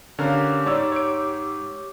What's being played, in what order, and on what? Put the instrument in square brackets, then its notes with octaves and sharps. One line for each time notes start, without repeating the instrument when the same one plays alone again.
[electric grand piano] D3 [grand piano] C#4 A#4 F5 [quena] G4
[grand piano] G#2 [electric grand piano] C#5 D5 E6
[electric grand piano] C#5 D7